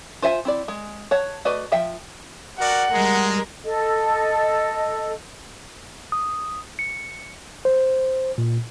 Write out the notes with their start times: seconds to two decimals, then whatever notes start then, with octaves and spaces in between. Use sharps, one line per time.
0.22 F4 C5 E5 G#5
0.45 C4 E4 D5
0.68 G#3
1.11 C#5 F#5 A5
1.45 A3 F#4 B4 D5 D#5
1.72 F3 E5 G5
2.59 F#4 A#4 D5 F#5
2.92 G3 G#3 A#4
3.66 A4 D#5
6.12 D#6
6.79 C#7
7.65 C5
8.38 A#2